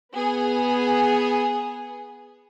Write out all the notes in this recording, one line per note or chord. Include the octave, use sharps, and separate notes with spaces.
B3 G#4